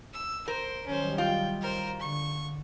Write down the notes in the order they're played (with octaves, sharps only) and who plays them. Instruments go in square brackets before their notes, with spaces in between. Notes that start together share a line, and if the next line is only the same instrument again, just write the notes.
[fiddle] E6
[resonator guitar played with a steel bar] A#4 [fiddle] C5
[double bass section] D#3 F#3 G3 [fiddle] C#4 C5
[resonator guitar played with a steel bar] F4 [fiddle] G5
[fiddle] A#4 C5
[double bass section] D3 [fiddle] C#6